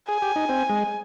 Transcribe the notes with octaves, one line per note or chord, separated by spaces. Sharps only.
G#4 G#5
G4
D#4
C4
G#3